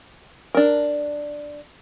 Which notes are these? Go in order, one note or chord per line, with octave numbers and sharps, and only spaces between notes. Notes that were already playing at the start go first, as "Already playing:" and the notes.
D4 A#4